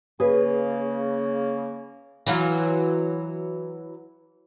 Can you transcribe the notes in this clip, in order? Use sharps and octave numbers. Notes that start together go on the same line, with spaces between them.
C#3 A#3 G#4 B4
E3 F#3 F4